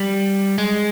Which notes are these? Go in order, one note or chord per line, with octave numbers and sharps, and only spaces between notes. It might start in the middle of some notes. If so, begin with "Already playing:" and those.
Already playing: G3
G#3